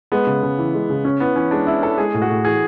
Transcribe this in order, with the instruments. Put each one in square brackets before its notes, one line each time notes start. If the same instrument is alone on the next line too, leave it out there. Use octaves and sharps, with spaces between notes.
[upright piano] G#3 [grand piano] B3
[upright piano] C#3
C#3
E3
G#3
C#3
C#4
[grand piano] B3 [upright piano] E4
[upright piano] E3 [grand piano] C#4
[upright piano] G#3 [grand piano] D4
[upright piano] C#4 [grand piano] E4
[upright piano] E4 [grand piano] A4
[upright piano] G#3 [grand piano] G#4
[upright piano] A2
[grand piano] F#4
[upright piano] A2
[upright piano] E3 [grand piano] G#4